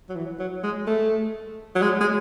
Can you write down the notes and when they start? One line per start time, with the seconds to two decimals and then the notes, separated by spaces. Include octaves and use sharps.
0.09 F#3
0.16 E3
0.39 F#3
0.63 G#3
0.87 A3
1.76 F#3
1.82 G#3
2.01 G#3